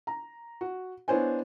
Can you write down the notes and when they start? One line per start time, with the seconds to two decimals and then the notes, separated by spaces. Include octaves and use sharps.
0.07 A#5
0.61 F#4
1.08 B3 D4 E4 C5 C#5 G#5